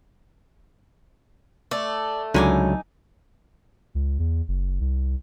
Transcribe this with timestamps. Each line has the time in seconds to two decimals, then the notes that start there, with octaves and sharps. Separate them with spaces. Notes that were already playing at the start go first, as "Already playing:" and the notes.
1.71 A3 D5
2.34 C#2 D3 F#3 D#4 G#5 D6
3.95 C#2
4.19 E2
4.48 F#1
4.80 C2